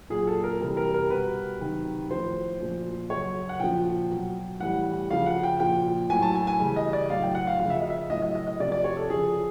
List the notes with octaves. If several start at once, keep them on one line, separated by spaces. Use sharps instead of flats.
A#2 F#3 G#4
A4
A#4
C3 E3 G3
A#4
A#4
B2 G3 B4
C3 D#3 F#3
A2 F3 C5
A#2 F3
C#3 F#3 C#5
F#5
A#2 F3 G5
B2 F#3
A2 E3 G3 F#5
C#3 F3 F5
F#5
G5
A#2 F3 G5
A2 F#3 G#5
A5
G#5
G#5
C#3 E3 G3
D#5
D5
A2 F#3 F5
G5
F#5
F5
C#3 F3 F5
E5
D#5
E5
A2 F#3 D#5
D#5
D#5
D#5
C3 F3 D5
D5
C#5
A4
C#3 F3 G#4